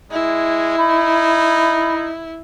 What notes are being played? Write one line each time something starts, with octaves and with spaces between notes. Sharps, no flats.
G#3 E4
D#4 B5